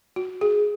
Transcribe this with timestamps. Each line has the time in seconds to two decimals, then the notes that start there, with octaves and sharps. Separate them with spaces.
0.16 F#4
0.41 G#4